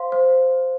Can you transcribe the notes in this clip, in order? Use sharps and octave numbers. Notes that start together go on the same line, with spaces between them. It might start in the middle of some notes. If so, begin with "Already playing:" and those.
Already playing: C5 F5 C6
C5